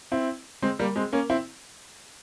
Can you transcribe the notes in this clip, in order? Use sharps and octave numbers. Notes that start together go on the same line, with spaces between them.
C4 E4
G#3 C4
G3 A#3
G#3 C4
A#3 C#4
C4 E4